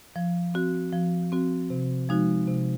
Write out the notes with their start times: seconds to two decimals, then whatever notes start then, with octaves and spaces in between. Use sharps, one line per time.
0.16 F3
0.54 C4 F#4
0.93 F3
1.32 C4 F#4
1.70 C3
2.09 F3 G#3 D#4 F#4
2.48 C3